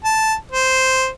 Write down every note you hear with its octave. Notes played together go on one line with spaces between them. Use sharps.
A5
C5